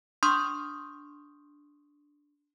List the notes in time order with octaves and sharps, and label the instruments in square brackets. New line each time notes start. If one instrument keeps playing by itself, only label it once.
[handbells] D4 C6 C#6 D#6 F6 G6